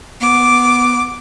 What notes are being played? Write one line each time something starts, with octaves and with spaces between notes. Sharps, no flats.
B3 D6